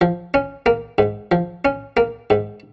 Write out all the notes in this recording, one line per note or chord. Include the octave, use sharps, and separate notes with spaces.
F3
C#4
A#3
G#2
F3
C#4
A#3
G#2